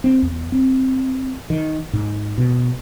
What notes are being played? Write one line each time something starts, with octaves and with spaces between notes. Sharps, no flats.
C4
E2
C4
D#3
G#2
B2